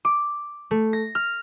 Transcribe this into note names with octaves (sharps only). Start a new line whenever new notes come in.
D6
A3
A#6
F6